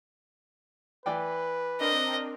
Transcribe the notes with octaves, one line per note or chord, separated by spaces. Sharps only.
E3 B4 D5 G5
C4 D4 A#4 D#5